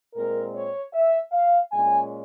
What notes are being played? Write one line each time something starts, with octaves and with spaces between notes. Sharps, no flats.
A#2 G#3 C4 A#4
C#5
E5
F5
A#2 G#3 C#4 G#5